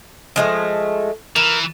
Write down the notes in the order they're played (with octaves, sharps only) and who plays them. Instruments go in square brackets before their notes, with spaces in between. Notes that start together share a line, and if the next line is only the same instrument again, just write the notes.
[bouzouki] F3 G#3 A3
[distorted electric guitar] E3 [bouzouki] A#4